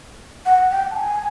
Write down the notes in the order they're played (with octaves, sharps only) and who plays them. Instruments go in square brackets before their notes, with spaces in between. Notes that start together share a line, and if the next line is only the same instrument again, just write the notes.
[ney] F#5
G5
A5
G#5